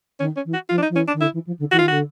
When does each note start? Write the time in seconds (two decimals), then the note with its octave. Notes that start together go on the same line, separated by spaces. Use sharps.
0.19 D#3 C#4
0.36 C#4
0.44 E3
0.53 F#4
0.69 F3 F4
0.78 D4
0.82 D#4
0.89 F3
0.95 E3 C#4
1.07 D4
1.13 D#3
1.21 D3 E4
1.33 E3
1.46 F3
1.59 D3
1.71 E3 F#4
1.79 D#3 F4
1.88 D3 F#4